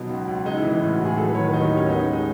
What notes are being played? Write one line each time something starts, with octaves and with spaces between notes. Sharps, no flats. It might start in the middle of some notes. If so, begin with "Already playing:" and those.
Already playing: B2 F#3 D#4
C#2
C#2
G#3 D#4
E4
E3
D#4
A2
F#4
A2
G#4
F#3 A4
B4
D#3 C#5
B4
D#2 D#4
D#4
D#2
C#4
B3 D#4
C#4
G#3
D#4